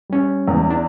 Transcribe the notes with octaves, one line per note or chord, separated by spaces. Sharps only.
G3 C#4
E2
D4